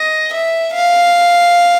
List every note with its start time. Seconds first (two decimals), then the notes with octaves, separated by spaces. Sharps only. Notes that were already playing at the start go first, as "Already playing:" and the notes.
Already playing: D#5
0.33 E5
0.75 F5